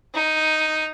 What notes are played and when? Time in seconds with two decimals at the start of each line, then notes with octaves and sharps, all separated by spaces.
0.14 D#4